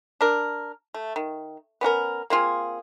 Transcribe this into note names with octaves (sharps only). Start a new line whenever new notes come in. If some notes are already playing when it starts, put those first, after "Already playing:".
D4 A#4
A3
D#3
B3 C#4 F#4 A#4
A#3 C4 F4 G#4